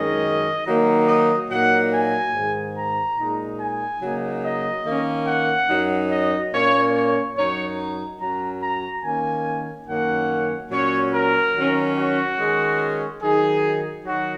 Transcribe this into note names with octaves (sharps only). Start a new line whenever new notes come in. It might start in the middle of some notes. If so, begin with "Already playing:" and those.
Already playing: F#2 D#3 G#3 C#4 D#5
D#3 F#3 A#3 D#4
D#5
A#2 F#3 A#3 D#4 F#5
G#5
G#2 D#3 G#3
A#5
A#2 G#3 D#4
G#5
C#3 F#3 A#3 D#4
D#5
D#3 A#3 C#4
F#5
F#2 F#3 D#4
D#5
A#2 A#3 C#4 C#5
C#5
F#2 F#3 D#4 C#5
F#2 F#3 C#4 A#5
A#5
D#3 A#3 C#4 G#5
F#2 D#3 A#3 C#4 F#5
A#2 F#3 C#4 C#5
A#4
D#3 F#3 C#4
F#4
D#3 G#3 C#4
D#3 F#3 D#4 G#4
D#3 F#3 D#4 F#4